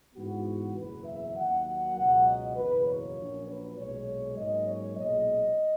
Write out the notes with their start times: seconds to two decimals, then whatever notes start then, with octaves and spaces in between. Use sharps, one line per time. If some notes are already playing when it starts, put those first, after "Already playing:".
0.15 G#2 E3 B3 F#4
0.76 F#1 E2 B2 F#3 B4
1.05 E5
1.36 D#2 D#3 F#3 F#5
1.96 C#2 B2 F#3 B3 F#5
2.27 D#5
2.56 F#1 E2 B2 A#3 B4
2.86 C#5
3.16 A#1 A#2 F#3 C#4
3.47 B4
3.77 B1 A#2 G#3 C#5
4.37 G#2 F#3 A#3 C#4 D#5
4.67 C#5
4.97 B1 A#2 G#3 C#4 D#5